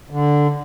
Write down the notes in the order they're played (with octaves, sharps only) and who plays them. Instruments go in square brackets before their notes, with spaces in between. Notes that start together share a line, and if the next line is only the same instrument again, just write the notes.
[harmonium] D3